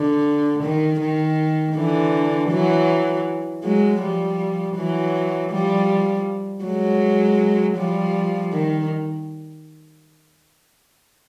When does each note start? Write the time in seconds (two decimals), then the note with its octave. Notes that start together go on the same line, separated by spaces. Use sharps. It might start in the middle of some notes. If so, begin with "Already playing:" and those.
Already playing: D3
0.63 D#3
1.00 D#3
1.76 D3 E3
2.50 E3 F#3
3.63 F#3 G#3
4.01 F3 G3
4.76 E3 F#3
5.51 F3 G3
6.64 F#3 G#3
7.77 F3 G3
8.53 D#3